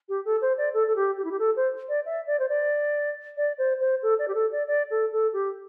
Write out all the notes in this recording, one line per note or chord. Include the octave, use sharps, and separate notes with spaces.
G4
A4
C5
D5
A4
A4
G4
G4
E4
G4
A4
C5
D5
E5
D5
C5
D5
D5
C5
C5
A4
D5
G4
A4
D5
D5
A4
A4
G4